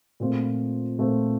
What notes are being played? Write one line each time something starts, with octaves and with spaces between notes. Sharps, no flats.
A#2 A3 C4 F4 C5
A#2 A3 C4 F4 C5